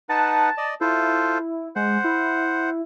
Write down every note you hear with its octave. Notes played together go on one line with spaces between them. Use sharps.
D#4 B4 F#5 A5
D5 D#5
E4 F4 A4 C5
G#3 C5 F#5
E4